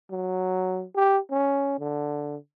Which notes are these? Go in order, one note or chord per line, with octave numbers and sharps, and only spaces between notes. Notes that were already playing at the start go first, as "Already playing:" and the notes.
F#3
G4
C#4
D3